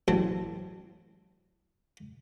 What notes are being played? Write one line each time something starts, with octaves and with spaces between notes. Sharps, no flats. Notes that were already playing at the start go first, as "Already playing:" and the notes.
A1 F#3 C4 A5